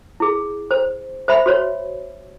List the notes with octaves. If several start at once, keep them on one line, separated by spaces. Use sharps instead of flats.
E4 G#4
C5
C5 E5 B5
F#4 C5 C#5